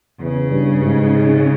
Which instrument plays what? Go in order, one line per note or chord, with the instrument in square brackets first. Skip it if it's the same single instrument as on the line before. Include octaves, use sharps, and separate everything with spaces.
[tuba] E2 [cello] C#3
[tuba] G2
G#2